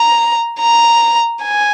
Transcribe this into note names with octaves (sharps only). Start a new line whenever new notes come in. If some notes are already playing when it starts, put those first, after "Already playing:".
Already playing: A#5
A#5
G#5